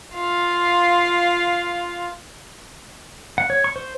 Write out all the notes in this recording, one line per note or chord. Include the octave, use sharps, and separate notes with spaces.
F4 F5
F#5
C#5
C#6
C5